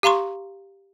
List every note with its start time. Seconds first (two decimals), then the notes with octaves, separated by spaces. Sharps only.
0.03 G4 F5 A#5 C6 C#6